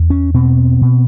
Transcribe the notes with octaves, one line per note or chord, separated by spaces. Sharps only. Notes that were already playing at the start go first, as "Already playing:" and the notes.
Already playing: E2
C#4
B2 C4
B2